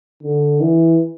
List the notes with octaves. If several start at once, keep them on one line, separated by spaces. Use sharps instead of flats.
D3
E3